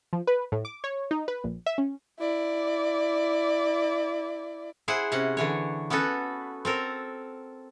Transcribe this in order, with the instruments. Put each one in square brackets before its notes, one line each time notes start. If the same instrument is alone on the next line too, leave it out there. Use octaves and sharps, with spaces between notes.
[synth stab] F3
B4
A2
D6
C#5
D#4
B4
A#1
E5
C#4
[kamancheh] E4 D5
[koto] E4 G#4 C5 F#5
C3 C#4 F#5
D3 E3 C#5
B3 C#4 F#4 A4 B4
C4 A4 A#4